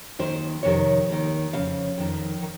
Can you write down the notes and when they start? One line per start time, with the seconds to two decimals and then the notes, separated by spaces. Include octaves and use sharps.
0.19 D#2 D#3 C5
0.63 F2 C3 D#3 C#5
1.08 D#2 D#3
1.53 F2 C#3 F5
1.98 F2 D#3
2.42 D#3